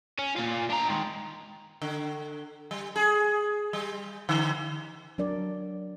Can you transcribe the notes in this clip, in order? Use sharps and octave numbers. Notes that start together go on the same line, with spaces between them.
C#4
A#2 F4
D4 A#5
D#3 G#3
D3
G3
G#4
G3
D3
F#3 D4 A#4 D5